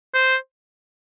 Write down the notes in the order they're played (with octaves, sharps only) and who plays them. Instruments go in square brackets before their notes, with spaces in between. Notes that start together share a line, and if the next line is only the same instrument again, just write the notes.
[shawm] C5